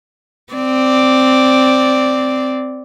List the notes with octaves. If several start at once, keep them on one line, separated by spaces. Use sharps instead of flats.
C4 D5